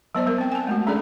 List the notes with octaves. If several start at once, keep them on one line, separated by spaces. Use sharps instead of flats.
F#3 B3 C5 D5
G3 A#4
C4 G5
G#5 A5
G#3 A3 F#4
G3 C#4 D4 G#4 A4 D5